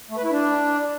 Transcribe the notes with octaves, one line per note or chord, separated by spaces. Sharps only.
A3
B4
E4
D4